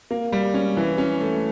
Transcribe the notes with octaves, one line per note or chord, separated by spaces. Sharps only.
A#3
G3
C#4
E3
C#4
A3